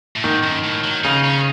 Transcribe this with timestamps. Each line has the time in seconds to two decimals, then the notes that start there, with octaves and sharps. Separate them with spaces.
0.16 A2
0.24 G#2 D#3
0.44 F#2
0.64 A2
0.84 F#3
1.04 C#3 D#4
1.24 C#4